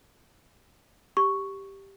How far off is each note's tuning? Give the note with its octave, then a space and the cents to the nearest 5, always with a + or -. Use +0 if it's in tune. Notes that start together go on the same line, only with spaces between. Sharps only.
G4 +0 C#6 +0